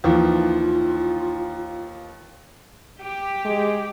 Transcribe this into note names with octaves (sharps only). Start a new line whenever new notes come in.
D#2 E3 F3 F4
G4
G#3